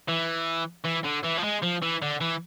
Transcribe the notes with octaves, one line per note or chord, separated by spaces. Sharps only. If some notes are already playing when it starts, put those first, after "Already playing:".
E3
E3
D3
E3
F3
G#3
F3
E3
D3
E3